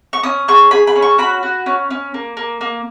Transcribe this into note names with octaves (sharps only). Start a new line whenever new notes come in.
C#6
C#4 D#6
G#4 C#6
G#4 B5
B5
C#4
C#6
F#4 B5
F#4
C#4
C#4
A#3
A#3
A#3